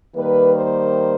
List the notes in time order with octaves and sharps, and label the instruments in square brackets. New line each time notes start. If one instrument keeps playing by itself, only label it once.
[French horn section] D#3 G3 A#3 B4
C5